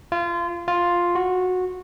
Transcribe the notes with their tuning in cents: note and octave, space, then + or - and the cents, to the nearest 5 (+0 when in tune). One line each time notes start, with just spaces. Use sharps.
F4 -25
F4 +5
F#4 -15